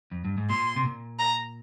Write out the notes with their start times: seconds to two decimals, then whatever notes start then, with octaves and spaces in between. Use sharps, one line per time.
0.11 F2
0.25 G2
0.38 G#2
0.50 A#2 C6
0.76 C3
0.85 A#2
1.19 A#5